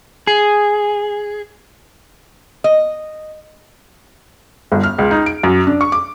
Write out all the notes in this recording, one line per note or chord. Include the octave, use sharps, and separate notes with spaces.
G#4
D#5
G1
F6
C#2
D#4
D7
F#2
D4
C#6
D6